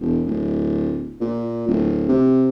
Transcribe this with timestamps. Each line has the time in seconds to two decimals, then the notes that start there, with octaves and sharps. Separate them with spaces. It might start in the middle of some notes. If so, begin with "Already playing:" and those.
0.01 E1
0.26 D1
1.21 A#2
1.68 D1
2.08 C3